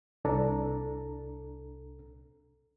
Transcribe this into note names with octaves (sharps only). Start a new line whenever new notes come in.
C2 D4 A4 A#5